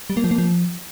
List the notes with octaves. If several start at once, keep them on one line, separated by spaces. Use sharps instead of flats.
G3
A#3
F3
A#3
F3